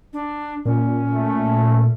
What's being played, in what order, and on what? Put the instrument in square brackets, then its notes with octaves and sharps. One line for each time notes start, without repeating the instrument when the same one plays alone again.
[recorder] D4
[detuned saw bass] A#2 [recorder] C#4
[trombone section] A3